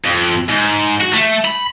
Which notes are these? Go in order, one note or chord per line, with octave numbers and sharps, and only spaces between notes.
F2
G#2
F#4
A3
B5